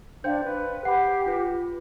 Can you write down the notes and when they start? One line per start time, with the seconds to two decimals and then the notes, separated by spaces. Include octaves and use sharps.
0.24 D4 C5 F5 G5 G6
0.44 B4
0.85 G4 F#5 B5 C7
1.26 F4 B4